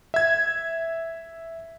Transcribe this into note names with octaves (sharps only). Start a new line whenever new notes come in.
E5 G#6